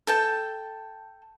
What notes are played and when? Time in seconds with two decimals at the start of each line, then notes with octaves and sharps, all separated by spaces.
0.07 A4 G5 A5